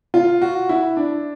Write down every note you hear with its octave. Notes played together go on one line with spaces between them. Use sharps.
F4
F#4
E4
D4